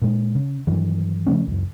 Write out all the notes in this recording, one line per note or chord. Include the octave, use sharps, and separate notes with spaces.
A#2 G#3
C#3
G2 D#3 E3 F#3
C#3 F3 A3 C#4
C#2 F#2